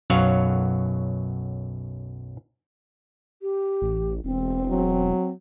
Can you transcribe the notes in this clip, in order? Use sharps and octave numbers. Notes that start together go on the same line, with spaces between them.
B1 F#2 F#3 C#5 F5 F#5
G4
A1
E1 C4
F#3